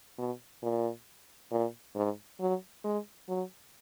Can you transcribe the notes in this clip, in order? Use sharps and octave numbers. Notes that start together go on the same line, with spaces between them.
B2
A#2
A#2
G#2
F#3
G#3
F#3